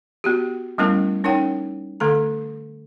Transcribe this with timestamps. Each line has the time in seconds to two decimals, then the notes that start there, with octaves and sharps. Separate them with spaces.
0.24 B3 F#4 G4
0.78 G3 A3 B3 C#4 E4 A#4
1.24 C#4 D#4 A#4 C#5 F#5 G5
2.00 D3 A3 A4 A#5